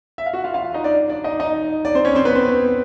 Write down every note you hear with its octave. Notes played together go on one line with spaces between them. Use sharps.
E5
F5
F#4 F#5
F4 F5
F4 F5
D#4 D#5
D4 D5
D4 D5
D#4 D#5
D#4 D#5
D4 D5
C4 C5
C#4 C#5
C4 C5
B3 B4
C4 C5